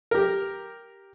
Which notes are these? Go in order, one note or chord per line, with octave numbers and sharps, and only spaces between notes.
G4 A#4